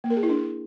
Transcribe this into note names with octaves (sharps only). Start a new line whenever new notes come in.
A#3
A#4
G#4
E4
D4